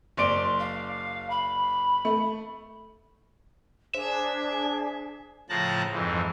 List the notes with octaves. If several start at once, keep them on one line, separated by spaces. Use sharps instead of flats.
F#1 D5 C6 D7
F5
B5
A3
D4 G#4 C5 E5
A2 C#3 F3 A5 A#5 F#6
F2 G#2 E3